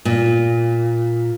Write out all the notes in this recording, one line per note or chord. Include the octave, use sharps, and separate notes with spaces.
A#2